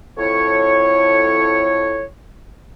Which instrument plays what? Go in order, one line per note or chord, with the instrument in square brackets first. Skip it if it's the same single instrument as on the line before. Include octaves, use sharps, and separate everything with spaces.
[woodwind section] F2 A2 E4 C#5